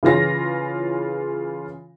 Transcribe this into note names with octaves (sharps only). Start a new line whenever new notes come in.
C#3 E3 F4 A#6